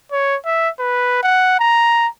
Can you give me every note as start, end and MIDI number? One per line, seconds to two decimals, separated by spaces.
0.12 0.36 73
0.45 0.69 76
0.79 1.21 71
1.23 1.56 78
1.59 2.08 82